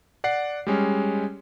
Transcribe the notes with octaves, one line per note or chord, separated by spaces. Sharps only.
D5 F#5 C7
G3 G#3 C#4